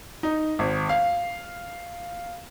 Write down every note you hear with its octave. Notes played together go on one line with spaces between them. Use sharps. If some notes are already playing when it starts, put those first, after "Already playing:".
D#4
G#1
F5